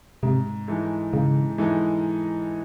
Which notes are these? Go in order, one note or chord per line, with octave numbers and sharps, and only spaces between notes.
G#2 C3
E3 G#3 D#4 A4
G#2 C#3
E3 G#3 D#4 A4